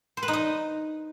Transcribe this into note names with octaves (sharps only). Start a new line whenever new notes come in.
C5
B4
D#4
D#5